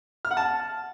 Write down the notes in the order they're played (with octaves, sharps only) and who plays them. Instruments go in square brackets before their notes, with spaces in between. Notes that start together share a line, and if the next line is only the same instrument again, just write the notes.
[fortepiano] F6
F#5
A5